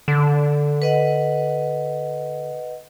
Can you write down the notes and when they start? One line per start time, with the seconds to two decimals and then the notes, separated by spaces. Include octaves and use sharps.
0.08 D3
0.82 B4 D#5 F#5